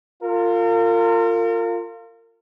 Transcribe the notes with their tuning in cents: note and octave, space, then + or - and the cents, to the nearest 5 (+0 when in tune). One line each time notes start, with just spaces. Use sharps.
F4 +0 A#4 -40